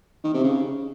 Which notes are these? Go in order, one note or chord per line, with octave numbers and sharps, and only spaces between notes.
D#3
C3
C#3